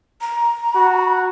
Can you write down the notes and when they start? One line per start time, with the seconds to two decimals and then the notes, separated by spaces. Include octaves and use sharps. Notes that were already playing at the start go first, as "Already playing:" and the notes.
0.21 A#5
0.75 F#4